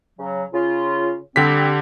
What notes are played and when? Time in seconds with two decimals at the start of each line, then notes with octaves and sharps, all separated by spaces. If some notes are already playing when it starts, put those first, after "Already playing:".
0.19 C#3 F#3
0.54 C#3 F4
1.36 D3 G3 C4 G4 B6